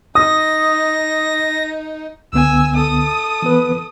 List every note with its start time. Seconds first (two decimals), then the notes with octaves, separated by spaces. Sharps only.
0.15 D#4 D#6 A#6
2.33 C#2 D3 B3 G#5 E6
2.75 A4 D#6
3.42 E3 B3 B4